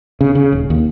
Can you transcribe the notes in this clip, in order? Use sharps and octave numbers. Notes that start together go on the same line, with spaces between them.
C#3
C#3
D#1
D#2